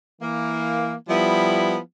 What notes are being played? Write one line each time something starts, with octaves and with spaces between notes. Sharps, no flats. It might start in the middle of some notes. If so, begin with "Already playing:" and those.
E3 A#3
F3 G3 B3 E4